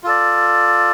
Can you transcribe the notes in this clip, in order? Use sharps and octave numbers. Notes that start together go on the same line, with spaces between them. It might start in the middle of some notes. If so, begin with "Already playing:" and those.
F4 A4 D5